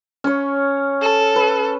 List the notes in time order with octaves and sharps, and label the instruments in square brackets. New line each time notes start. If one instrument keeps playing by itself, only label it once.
[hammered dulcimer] C#4 C#5
[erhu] A4
[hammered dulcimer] B4